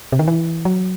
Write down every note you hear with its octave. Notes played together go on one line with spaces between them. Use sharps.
C3
D#3
E3
F#3